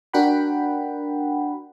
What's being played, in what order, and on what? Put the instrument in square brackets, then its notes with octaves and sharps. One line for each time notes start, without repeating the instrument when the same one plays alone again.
[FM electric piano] D4 F#4 A#4 F#5 G5 B5